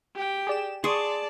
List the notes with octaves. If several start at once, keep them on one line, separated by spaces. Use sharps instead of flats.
G4 G5
G#4 D5 E7
G#4 D5 A5 C6 C#6 D#6